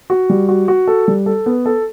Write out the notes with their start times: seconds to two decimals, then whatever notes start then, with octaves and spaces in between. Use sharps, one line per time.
0.10 F#4
0.29 G3
0.49 F#4
0.68 F#4
0.87 A4
1.08 G3
1.26 A4
1.46 B3
1.66 A4